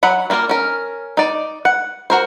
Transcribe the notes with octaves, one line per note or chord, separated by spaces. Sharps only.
F#3 F#5 B5
G3 A#3 F4 A#4
C#4 A#4
D#4 D5
F#5
F#4 A#4 C5